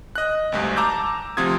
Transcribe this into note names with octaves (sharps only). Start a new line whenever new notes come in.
D#5 F#6
G#1 D2 G2
A5 A#5 D6 E6 G6
D2 C3 F3 F4 D#6 G#6